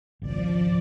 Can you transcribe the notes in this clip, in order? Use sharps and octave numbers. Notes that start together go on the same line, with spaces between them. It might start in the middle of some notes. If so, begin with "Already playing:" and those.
G#1 C#2 F3 D5